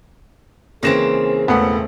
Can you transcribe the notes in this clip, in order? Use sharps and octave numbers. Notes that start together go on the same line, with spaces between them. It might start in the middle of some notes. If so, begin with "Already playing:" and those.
C#3 E3 A#3 C4 G#4 A#6 E7
E1 A2 A3 B3